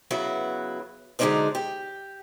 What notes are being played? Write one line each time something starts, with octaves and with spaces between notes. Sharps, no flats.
C#3 F#3 B3 E4 F#4
D3 F#3 G#3 D4 D#4 C5
G4